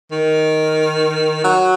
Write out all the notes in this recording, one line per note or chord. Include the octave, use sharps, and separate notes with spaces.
D#3
F#3